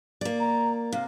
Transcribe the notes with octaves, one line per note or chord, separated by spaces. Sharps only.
A#3 D5
A#5
C3 F5